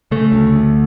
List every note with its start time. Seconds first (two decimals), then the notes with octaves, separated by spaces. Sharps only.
0.11 C#3 A3
0.32 D2
0.53 D2